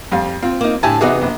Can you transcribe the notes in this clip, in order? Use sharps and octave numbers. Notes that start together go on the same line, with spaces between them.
F2 G3 F5
C4 F4
A#3 D#4
A2 D3 E4 G4 G#5 A5
C3 E3 B3 D#4 F#4 G#4
A#1